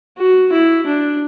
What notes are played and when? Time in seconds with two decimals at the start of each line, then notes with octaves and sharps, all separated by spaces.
0.18 F#4
0.52 E4
0.86 D4